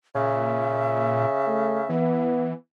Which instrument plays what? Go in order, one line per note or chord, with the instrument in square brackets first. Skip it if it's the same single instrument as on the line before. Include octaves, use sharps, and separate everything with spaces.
[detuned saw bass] A#2 [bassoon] C#3 [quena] E5
[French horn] A3
[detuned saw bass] E3 [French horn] B3